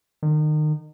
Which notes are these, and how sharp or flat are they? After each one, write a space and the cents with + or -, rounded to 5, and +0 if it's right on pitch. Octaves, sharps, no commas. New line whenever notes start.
D#3 -30